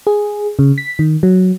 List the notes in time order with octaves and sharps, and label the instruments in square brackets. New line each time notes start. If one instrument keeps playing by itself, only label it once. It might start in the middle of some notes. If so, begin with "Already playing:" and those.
[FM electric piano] G#4
C#3
B6
D#3
F#3